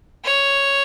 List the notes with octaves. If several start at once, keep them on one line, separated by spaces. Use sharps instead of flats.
C#5